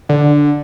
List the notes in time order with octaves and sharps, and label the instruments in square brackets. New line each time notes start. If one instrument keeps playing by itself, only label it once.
[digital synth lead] D3